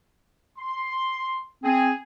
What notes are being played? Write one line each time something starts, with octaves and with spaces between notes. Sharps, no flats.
C6
C4 G#4